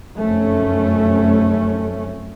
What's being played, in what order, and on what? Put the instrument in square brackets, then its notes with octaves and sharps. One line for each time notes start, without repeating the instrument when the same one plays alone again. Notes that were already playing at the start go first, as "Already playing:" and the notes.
[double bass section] F1 F#2 A3 C#4